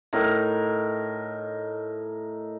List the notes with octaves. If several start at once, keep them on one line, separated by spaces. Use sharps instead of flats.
A2 D#4 A#4